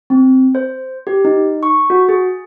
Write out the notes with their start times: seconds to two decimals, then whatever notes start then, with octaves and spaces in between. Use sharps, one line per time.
0.10 C4
0.55 C5
1.07 G4
1.25 D#4
1.63 C#6
1.90 F#4
2.09 G#4